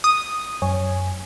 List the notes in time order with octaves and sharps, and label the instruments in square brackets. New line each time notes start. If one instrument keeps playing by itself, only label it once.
[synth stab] D#6
[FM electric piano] F#2 C#5 G#5